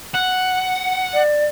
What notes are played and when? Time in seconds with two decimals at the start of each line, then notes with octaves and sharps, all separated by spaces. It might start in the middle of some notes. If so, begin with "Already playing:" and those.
0.14 F#5
1.14 D5